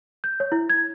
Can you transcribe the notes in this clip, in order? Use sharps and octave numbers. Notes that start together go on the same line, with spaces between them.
G6
C#5
E4
G#6